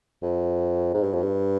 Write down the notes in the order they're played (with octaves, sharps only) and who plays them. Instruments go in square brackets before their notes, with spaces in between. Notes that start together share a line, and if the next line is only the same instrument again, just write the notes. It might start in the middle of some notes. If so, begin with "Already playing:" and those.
[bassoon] F2
G#2
G2
F2
G2